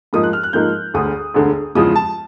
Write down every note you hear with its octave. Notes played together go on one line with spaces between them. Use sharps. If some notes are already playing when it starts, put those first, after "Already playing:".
G#2 F3 A#3 D#4 D#6
F#6
F6
F#6
G#2 F3 A#3 D#4 G6
E1 D2 D3 D#6
E1 D2 D3
E2 C#3 F3 G#3 D#6
A5